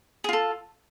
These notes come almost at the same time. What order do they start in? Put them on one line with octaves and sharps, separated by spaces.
G#4 F4 A4